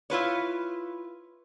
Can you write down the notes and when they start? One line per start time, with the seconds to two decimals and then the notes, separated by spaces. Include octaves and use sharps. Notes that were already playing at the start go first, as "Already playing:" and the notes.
0.10 E4 F4 B4 C#5